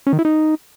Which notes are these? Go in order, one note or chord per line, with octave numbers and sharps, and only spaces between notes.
C#4
D#3
E4
D#4